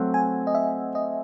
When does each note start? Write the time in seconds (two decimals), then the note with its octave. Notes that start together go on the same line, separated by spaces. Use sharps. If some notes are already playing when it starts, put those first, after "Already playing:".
Already playing: F#3 A3 C4 F#5
0.14 G#5
0.47 D#5
0.55 E5
0.95 D#5